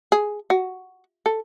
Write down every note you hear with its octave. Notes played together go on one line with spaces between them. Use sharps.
G#4
F#4
A4